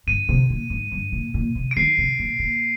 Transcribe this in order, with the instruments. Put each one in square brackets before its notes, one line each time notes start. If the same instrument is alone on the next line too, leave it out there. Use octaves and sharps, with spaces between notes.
[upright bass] G2 [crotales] D#7
[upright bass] C3
A#2
G#2
G2
A#2
A#2
C3
[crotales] D7
[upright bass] D#3 [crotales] C7
[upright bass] C3
A#2
A#2